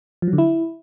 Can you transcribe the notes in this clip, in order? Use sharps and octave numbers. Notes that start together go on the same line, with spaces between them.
F3
F#3
D3
E4